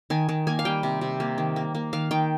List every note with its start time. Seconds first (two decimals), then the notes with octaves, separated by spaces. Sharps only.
0.10 D#3 G#5
0.29 D#3
0.47 A#3 G#5
0.59 F5
0.65 G3 G5
0.83 C3
1.01 C3
1.20 A#3
1.38 D#3
1.56 A#3
1.75 A#3
1.93 D#3 F5
2.11 D#3 G5